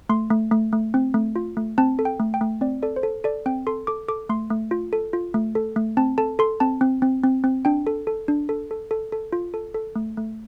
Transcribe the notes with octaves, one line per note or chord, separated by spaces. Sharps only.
A3 C6
A3
A3
A3
C4
A3
F4
A3
C4 A5
A4
G5
A3
G5
A3
C4 D5
A4 D5
C5
A4
A4 D5
C4 G5
A4 C6
A4 D6
A4 D6
A3 C6
A3
F4
A4
F4
A3
A4
A3
C4 A5
A4 A5
A4 C6
C4 A5
C4
C4
C4
C4
D4 G5
A4
A4
D4
A4
A4
A4
A4
F4
A4
A4
A3
A3